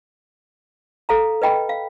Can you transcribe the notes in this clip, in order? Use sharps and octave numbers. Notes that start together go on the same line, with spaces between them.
A4 F5 A#5
B4 D#5 G5 B5
F5